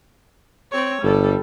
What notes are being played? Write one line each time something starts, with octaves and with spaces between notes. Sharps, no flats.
C4 C#5
G1 G3 A4